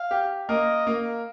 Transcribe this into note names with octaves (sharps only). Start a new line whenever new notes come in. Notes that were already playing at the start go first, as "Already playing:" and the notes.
Already playing: F5
G4
A#3 A#4 D#5
A#3 A#4